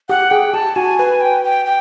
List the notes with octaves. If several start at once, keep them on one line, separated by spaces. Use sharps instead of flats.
G4 F#5
G#4 G5
G4 A5
F#4 G#5
B4 G#5
G5
G5
G5